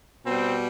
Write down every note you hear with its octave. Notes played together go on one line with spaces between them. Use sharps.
B2 G3 C4